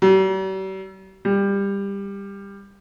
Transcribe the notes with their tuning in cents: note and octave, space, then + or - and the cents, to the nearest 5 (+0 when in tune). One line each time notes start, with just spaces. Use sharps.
G3 -45
G3 +20